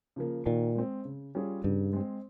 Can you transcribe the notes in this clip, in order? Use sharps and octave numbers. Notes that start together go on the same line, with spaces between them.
C#3 F3 A#3
A#2 D#3
G#3 C4
C#3
G3 C#4 F4 G#4
G2 C#3
G#3 C4